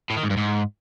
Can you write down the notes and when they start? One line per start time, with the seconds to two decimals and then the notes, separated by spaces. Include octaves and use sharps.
0.10 A2
0.17 D#3
0.23 G#2
0.30 G2
0.37 G#2